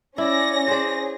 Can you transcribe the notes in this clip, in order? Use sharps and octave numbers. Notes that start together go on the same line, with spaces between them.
C#4 E4 D5 A#6
G#4 C5 D5